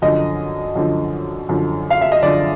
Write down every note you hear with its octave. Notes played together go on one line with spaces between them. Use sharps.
F#2 D3 F3 D#5
F#2 D3 F3
F#2 D3 F3
F5
E5
D#5
F#2 D3 F3 D5